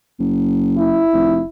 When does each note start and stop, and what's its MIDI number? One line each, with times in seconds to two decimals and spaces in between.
0.19 1.02 30
0.78 1.49 64
1.13 1.40 29